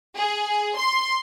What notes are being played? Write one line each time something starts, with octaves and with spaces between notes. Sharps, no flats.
G#4
C6